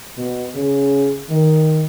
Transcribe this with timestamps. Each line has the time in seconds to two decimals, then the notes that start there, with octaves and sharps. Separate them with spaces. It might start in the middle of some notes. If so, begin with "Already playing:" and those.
0.18 B2
0.55 C#3
1.30 D#3